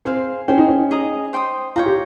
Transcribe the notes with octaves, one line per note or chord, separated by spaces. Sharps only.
C4 G#4 C5 F5 C6
C#4 G#4 C5 G5
D#4
C#4
G#4 D#5 A#5 D#6
C5 G5 C6 D#6
F4 C#5 G5 A#5
G4